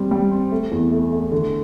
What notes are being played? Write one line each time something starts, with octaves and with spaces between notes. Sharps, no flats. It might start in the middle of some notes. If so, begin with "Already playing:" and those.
Already playing: G3 C4
G3
C4
A3
E2
A3
A3
D3